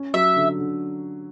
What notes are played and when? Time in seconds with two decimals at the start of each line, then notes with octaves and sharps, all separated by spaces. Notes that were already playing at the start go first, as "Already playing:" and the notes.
Already playing: C#4
0.14 F#3 E5
0.36 D3
0.59 D3